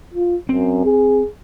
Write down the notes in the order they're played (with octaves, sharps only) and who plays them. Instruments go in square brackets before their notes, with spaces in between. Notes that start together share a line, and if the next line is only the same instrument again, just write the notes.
[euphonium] F4
[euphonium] F#2 [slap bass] C4
[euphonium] G#4